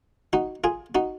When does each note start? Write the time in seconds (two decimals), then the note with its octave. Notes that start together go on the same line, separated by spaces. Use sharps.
0.33 D#4 F#4
0.64 F4 G#4
0.95 D#4 F#4